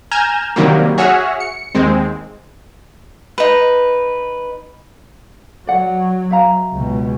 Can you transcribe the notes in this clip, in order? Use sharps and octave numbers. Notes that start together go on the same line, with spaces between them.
G#5 A#5 F6 G6 G#6 E7
C3 D#3 F#3 G3 A#3
F#4 G#4 C#5 E5 F#5 F6
C#7
D#2 G#3 C4
D#4 B4
F#3 D5 F#5
E5 F5 A#5
C#2 B2